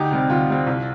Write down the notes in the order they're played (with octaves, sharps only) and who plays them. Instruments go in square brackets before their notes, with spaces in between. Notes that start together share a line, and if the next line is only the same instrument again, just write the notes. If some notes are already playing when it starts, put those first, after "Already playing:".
Already playing: [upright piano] D2 D#4 G4
C3 G3 C4
D2 F4
C3 G3 C4
C2